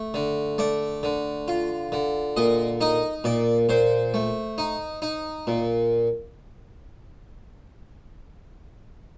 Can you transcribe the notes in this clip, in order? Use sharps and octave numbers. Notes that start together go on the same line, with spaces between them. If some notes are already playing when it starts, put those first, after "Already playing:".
Already playing: A3
D3
A3 D5
D3
F4
D3
A#2 D#5
D#4 D#5
A#2 D5
A#2 C5
A3
D#4
D#4
A#2